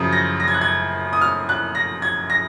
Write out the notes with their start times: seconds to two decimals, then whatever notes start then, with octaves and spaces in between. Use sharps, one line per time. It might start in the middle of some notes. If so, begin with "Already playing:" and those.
Already playing: F#2 C#3 F3 D#6
0.12 A#6
0.40 A#6
0.48 G#6
0.54 F#6
0.61 G#6
1.13 D#6
1.21 F6
1.49 F#6
1.75 A#6
2.02 G#6
2.30 A#6